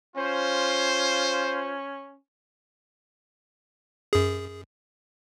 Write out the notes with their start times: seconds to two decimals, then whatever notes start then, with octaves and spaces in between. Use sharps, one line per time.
0.16 C#4 F4 C5
4.13 F#2 G#4